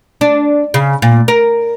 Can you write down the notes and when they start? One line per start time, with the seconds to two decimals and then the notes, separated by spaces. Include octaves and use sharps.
0.21 D4
0.74 C#3
1.02 A#2
1.28 A#4